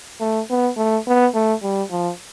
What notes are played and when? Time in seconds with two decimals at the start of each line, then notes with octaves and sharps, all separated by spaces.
0.20 A3
0.50 B3
0.77 A3
1.07 B3
1.34 A3
1.63 G3
1.91 F3